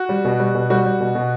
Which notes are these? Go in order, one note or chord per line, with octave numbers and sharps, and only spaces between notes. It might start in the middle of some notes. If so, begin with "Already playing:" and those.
Already playing: F#4
G3
B2
G3
B2
G3 F#4
G3
B2
B2